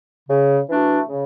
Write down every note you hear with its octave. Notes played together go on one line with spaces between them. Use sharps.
C#3
E3 A3 D4 F#4
C#3